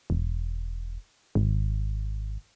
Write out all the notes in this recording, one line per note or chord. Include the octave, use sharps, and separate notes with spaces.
E1
G#1